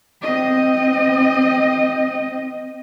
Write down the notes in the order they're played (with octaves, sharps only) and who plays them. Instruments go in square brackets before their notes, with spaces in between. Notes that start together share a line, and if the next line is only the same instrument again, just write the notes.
[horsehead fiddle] C4 D#5